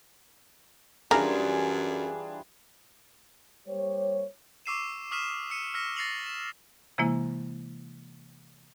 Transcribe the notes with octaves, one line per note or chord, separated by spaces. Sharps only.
F#2 E3 G3 D4 F4 G#4 A#4
G3 A#3 G4 C5 C#5
C#6 D6 E6 C7 D#7 E7
C#6 D#6 F6 B6 D#7 E7
E6 C#7 D#7
E6 F6 A#6 B6 C#7 E7
A6 A#6 C7 C#7 F7 F#7
E7
C3 E3 G#3 A#3 E4